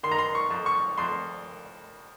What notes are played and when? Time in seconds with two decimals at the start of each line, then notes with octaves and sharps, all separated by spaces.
0.03 D#3 C6
0.11 A#5
0.19 C6
0.35 C#6
0.50 F2
0.66 C#6
0.98 F2 C6